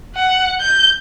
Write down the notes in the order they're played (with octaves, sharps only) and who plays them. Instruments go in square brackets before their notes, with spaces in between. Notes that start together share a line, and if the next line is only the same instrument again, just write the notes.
[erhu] F#5
G6